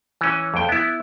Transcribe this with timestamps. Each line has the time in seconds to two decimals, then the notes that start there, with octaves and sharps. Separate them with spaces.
0.21 E3 C#4
0.54 F2 G5
0.69 B3 E4